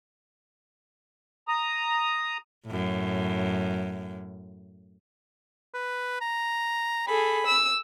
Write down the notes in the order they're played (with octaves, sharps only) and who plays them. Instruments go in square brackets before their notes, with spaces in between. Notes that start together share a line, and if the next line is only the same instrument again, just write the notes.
[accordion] A#5 D#6
[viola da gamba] F#2 A2
[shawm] B4
A#5
[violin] G#4 A4 [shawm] B5
[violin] E6